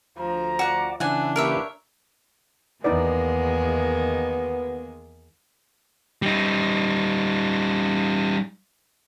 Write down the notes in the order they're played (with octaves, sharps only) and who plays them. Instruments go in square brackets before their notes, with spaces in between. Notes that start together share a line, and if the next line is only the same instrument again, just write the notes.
[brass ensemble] D2 A#5 [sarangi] F3
[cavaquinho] F#4 F#5 [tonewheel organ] D5
[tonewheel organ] C#3 E3 E4 [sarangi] D4 [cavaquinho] F#5 G#5
[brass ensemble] A#3 G4 B4 [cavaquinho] A#4 C#5 E5
[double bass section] E2 [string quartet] D#3 G#3 A#3 [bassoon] B3 [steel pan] D#4 E4 D5
[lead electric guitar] G3 D#4